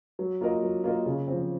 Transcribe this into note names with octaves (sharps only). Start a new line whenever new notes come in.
F#3
A#3 F4 A#4 D#5
F#3
A#3 F4 A#4 D#5
C#3
F3 C4